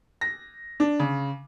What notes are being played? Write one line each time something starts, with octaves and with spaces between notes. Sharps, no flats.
A#6
D4
C#3